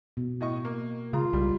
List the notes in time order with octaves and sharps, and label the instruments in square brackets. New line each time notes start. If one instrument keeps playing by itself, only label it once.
[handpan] B2
[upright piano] A2 D#5 C#6
A#3
[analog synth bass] C#3 [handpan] G#3 [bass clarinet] F4 [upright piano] A#5
[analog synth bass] C2 [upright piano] G3